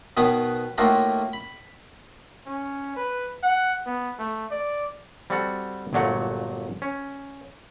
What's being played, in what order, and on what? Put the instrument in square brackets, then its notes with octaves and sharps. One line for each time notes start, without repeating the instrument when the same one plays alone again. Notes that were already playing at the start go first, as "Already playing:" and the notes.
[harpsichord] B2 D#3 B3 B4 C#5 D#6
A2 A3 A#3 D#4 F4 F#4
B5
[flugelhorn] C#4
B4
F#5
B3
A3
D5
[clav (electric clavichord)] G3 C4 F#4 A4 F#5
G1 A#2 F#3 A3 F#5
C#4